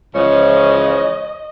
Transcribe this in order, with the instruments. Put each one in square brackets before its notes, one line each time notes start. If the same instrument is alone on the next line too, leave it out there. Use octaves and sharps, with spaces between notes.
[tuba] C#2 [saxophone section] C#3 E3 F3 [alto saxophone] C#5 [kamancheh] D#5